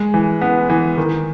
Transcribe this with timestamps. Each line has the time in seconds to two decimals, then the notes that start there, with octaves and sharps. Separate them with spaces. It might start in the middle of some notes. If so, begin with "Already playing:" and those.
Already playing: G#3
0.14 E3
0.42 B3
0.70 E3
0.97 D#3